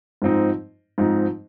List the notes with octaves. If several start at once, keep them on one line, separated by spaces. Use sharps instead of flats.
G#2 F3 C4 D#4
G#2 F3 C4 D#4